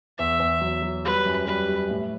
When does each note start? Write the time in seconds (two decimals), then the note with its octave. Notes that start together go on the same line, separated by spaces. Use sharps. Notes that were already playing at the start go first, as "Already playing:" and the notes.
0.18 E2 E5
0.39 E2
0.61 F#3
0.82 F#3
1.05 G3 B4
1.26 F#2
1.47 G3 B4
1.68 G3
1.90 A2